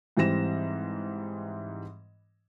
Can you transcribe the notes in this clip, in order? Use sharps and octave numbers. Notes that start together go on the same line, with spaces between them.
G#2 E3 G3 C4 A#6 E7